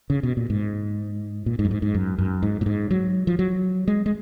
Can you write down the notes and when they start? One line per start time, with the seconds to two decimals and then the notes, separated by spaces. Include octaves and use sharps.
0.10 C#3
0.23 B2
0.37 A#2
0.50 G#2
1.46 A#2
1.59 G#2
1.65 F#2
1.71 G#2
1.82 G#2
1.94 F#2
2.18 F#2
2.43 G#2
2.61 A#2
2.66 G#2
2.91 F#3
3.27 F3
3.39 F#3
3.88 G#3
4.06 G#3